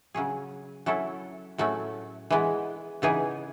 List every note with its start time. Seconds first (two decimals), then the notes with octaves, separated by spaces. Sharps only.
0.15 C#3 F#3 C#4 G#4
0.86 F#3 C#4 E4 A4
1.58 A2 F#3 A3 C#4
2.30 E3 G#3 B3
3.02 C#3 E3 B3 D#4 G#4